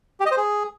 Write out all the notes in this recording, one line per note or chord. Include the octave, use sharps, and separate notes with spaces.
G4
D#5
C5
G#4